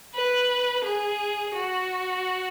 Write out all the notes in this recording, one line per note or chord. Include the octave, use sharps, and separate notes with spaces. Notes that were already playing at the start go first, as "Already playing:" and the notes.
B4
G#4
F#4